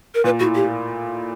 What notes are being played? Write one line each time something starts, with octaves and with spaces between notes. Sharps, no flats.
A#4
A#2 B4
A2 F#4
G4